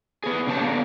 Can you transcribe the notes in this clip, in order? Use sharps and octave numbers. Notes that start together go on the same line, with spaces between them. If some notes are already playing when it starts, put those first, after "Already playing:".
B3 G#4
C#3 C#4 G4 A5
D3 A#3 B3